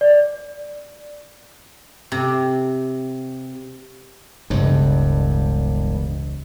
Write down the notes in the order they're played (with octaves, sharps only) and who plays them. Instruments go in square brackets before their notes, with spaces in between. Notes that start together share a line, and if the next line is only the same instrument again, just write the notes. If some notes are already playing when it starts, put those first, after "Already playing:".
[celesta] D5
[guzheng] C3
[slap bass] E1 G2 [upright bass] C#2